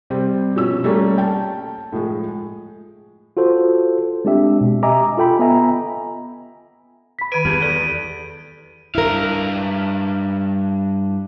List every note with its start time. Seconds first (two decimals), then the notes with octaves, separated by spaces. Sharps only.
0.10 C3 G3 C4
0.56 B2 F3 C#4 E6
0.84 G3 A3 A#3 C#4
1.18 G5 A5
1.92 A2 F3 G#3
3.37 F4 F#4 A4 C5
4.25 G#3 C4 D4 G4 E5
4.61 B2
4.83 G4 D#5 E5 G#5 A#5 D6
5.17 F4 A4 G5 B5
5.39 B3 D#5 E5 G#5 A#5
7.19 B5 B6
7.32 D#3 B4 D7 D#7
7.45 E2 G4
7.62 A4 D5
8.95 G2 E4 A#4 F5